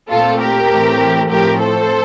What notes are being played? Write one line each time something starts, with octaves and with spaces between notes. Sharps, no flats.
A#2 A3 C4 F4 A4
G4 A#4
A2 E3 A3 C4
A2 F3 A3 C4 G4 A#4
A4 C5